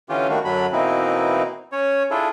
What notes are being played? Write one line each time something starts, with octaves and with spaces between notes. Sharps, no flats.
D3 E3 C#4 F4 G4
D#3 G3 A3 A#3 D4 F#4
F#2 D3 F#3 D4 B5
B2 E3 A#3 C4 D#4 E4
C#4 C#5
D4 E4 F4 G#4 A4